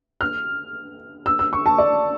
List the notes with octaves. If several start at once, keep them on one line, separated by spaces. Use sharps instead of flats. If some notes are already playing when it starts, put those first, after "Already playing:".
F6
E6
E6
C#6
A5
D5